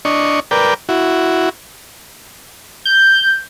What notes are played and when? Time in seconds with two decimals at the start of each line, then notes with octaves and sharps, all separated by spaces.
0.05 D4 D#5 C#6
0.51 A#4 B4 D5 G5
0.89 E4 F#4
2.85 G6